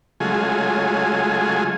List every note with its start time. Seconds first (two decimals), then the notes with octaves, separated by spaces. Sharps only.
0.20 C#3 F#3 G#3 A3 F4 G#4